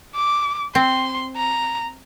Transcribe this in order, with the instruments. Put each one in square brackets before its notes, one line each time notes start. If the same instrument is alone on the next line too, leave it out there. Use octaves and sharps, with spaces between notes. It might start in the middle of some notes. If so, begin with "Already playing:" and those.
[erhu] D6
[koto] C4 [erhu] C6
[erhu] A#5